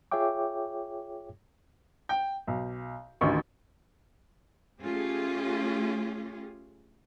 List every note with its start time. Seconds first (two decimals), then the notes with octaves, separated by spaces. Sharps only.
0.11 F4 G#4 C#5 E5 G5 D6
2.09 G5
2.47 B1
3.21 A1 D2 D#3 C#6
4.82 A3 C#4 F4 G4 G#4